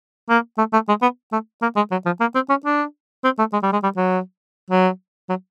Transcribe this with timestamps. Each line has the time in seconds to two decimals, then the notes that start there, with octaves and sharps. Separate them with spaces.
0.29 A#3
0.58 A3
0.73 A3
0.88 G#3
1.02 B3
1.33 A3
1.62 A#3
1.76 G#3
1.91 F#3
2.06 F3
2.21 A#3
2.35 C4
2.49 C#4
2.65 D4
3.24 C4
3.39 A3
3.53 G#3
3.63 G3
3.73 G#3
3.83 G3
3.97 F#3
4.70 F#3
5.29 F#3